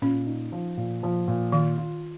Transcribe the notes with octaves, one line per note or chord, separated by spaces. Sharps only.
A#2 C#4
D#4
F3
A#2
F3
A#2
D#3 F4
F4